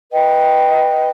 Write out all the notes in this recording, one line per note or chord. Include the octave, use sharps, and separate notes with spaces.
B4 D#5 G5